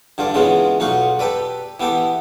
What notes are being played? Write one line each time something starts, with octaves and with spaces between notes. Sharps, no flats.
G2 D3 F4 D5
C#3 E3 G#3 B3 F4
B1 D#4 F4 F#5 C#6
G4 A4 B4 D5
E3 B3 G4 A4 D6